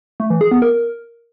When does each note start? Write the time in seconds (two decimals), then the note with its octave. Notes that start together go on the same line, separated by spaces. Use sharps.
0.20 A3
0.30 E3
0.41 G#4
0.51 B3
0.62 A#4